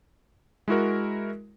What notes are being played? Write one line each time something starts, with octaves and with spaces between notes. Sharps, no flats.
G#3 E4 F#4 A#4